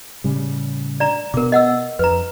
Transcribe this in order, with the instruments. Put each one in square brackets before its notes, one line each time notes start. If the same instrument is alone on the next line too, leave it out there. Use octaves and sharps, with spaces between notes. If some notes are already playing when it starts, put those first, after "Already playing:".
[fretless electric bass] A2 C#3 G3
[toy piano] D5 A#5
[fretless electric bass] B2 B3 [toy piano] A#4 D6
[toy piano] D#5 F#5 E6
[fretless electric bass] F2 [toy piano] B4 A#5